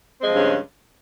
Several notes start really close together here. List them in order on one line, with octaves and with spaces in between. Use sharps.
C4 G#3 F3 G2 C#3